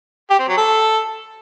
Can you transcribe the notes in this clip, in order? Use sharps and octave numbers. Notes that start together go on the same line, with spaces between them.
G4
C4
F#3
A4